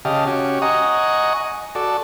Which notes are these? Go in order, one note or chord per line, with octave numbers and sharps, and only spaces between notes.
C#3 G4 D#5 F5 A5
C#4 F#4 G4
D#5 F#5 G#5 A#5 C#6 D#6
F#4 A4 D5